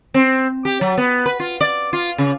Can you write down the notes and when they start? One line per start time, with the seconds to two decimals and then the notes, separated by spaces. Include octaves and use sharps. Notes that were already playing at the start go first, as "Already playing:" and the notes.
0.14 C4
0.65 G4
0.81 F#3
0.98 B3
1.26 B4
1.40 F4
1.61 D5
1.93 F4
2.18 C#3